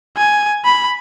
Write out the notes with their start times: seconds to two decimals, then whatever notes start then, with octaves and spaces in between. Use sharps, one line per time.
0.17 G#5
0.65 B5